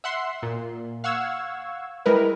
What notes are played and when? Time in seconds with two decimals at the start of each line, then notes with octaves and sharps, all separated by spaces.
0.04 E5 F#5 C6
0.43 A#2
1.04 F5 F#5 C#6 E6 G#6
2.06 G3 G#3 E4 A#4 B4